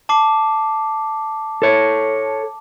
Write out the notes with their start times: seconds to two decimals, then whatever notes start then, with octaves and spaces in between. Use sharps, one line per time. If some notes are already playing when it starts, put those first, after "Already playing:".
0.09 A5 D6 C7
1.62 A4 C#5